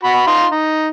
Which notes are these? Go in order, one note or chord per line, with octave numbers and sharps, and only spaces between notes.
F#4 B5
D#4 F5 C6
D#4